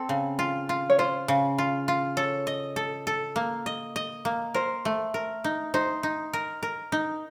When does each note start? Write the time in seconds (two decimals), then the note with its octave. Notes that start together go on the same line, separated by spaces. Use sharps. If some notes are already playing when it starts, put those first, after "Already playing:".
Already playing: C4 A4
0.09 C#3
0.39 F4
0.69 F4
0.90 C#5
0.99 F4 C5
1.28 C#3
1.58 F4
1.88 F4
2.17 A4 C#5
2.47 D#5
2.76 A4
3.07 A4
3.36 A#3
3.66 D#5
3.96 D#5
4.25 A#3
4.54 A#4 C5
4.85 A3
5.14 A#4
5.44 D#4
5.74 D#4 C5
6.03 D#4
6.33 A#4
6.63 A#4
6.92 D#4